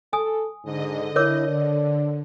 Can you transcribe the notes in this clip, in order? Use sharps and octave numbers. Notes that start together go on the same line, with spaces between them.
A4 G#5 D#6
G#2 D3 D#5
E4 A#4 C#5 D6
D3 D5